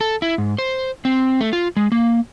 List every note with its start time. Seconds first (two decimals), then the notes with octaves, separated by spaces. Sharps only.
0.01 A4
0.22 E4
0.38 G#2
0.58 C5
1.05 C4
1.41 A3
1.53 F4
1.77 G#3
1.92 A#3